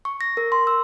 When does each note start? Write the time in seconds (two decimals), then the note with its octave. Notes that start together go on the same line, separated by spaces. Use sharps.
0.05 C#6
0.21 A#6
0.37 A#4
0.52 C6
0.67 E6